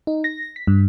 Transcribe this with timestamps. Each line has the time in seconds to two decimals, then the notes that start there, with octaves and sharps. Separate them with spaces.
0.07 D#4
0.24 A#6
0.56 B6
0.67 G2